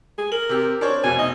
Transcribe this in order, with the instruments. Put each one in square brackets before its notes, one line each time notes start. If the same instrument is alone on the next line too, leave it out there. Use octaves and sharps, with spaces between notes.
[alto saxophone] G#4
[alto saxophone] A#4 [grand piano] F#7
[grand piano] C3 G4
[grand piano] D4 C5 C#5 [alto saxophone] A#4
[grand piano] F1 B2 [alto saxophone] G#5
[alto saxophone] D#5